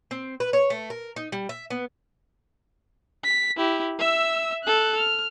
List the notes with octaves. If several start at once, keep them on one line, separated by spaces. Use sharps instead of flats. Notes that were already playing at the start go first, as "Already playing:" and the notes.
C4
B4
C#5
A3
A#4
D#4
G3
E5
B3
B6
E4 G4
E5 E6
A4 F#6
F6